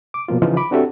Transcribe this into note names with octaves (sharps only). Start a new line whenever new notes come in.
D6
B2 F3 A#3 F4
C#3 E3 F3 D#4 F4
B5 D6
C4 D4 F#4 G4 A4 E5